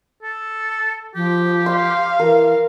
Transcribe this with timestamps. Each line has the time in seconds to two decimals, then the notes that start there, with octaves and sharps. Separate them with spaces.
0.23 A4
1.15 F3 G4
1.66 F5 C6
2.19 E3 A#4